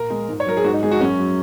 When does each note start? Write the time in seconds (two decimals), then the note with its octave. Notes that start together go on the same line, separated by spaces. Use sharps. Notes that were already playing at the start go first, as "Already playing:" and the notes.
Already playing: A#2 A#4
0.10 G#3
0.29 G#2
0.40 C#5
0.46 F#3 A#4
0.57 G#4
0.64 G#2 F#4
0.73 D#4
0.83 G#3 G#4
0.91 F#4
1.01 F#2 C#4
1.19 F#3